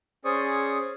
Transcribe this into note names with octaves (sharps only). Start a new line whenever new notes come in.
C#4 G#4 C5 D5 C#6 D#6